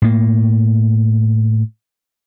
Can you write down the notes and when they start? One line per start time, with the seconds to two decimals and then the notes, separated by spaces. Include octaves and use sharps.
0.02 A2 A#3